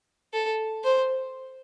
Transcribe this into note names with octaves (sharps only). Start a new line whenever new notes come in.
A4
C5